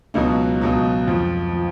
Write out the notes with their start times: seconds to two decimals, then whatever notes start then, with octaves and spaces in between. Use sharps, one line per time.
0.14 C#2 B2 F#3 D#4
0.61 C#2 B2 F#3
1.07 F2 F3 F4
1.53 F3